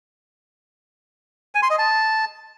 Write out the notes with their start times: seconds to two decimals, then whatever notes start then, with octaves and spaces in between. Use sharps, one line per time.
1.55 G#5
1.63 C6
1.71 D#5
1.78 A5